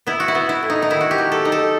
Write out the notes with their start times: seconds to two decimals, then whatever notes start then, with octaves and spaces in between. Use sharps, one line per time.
0.07 B3 E4
0.20 F#4
0.28 E4
0.35 B3
0.49 E4
0.63 A2
0.70 D#4
0.82 D#4
0.90 D#3 E4
1.01 F#4
1.11 G4
1.18 F#3
1.32 A4
1.45 D#4
1.52 A4